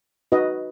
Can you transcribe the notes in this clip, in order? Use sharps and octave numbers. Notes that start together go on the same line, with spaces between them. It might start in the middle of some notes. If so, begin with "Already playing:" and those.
D#4 F#4 B4 D#5